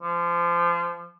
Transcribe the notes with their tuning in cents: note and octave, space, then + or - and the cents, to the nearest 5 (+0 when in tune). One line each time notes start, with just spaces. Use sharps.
F3 -25